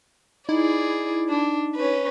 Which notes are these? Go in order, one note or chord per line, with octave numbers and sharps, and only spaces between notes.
D#4 E4 G#4 D5
D4
C#4 B4